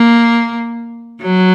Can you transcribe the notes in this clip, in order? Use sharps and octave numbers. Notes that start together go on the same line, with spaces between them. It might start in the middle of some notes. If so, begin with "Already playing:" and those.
Already playing: A#3
F#3